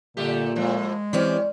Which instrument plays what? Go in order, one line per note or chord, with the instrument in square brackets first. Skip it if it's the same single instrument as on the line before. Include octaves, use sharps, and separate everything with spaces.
[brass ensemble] A#2 [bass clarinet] D3 [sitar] G3 A3 G4
[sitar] A2 F3 [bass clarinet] G#3
[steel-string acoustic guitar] E3 C4 G4 [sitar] C#4 [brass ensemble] D5